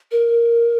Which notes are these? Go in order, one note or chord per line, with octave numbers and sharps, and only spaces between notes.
A#4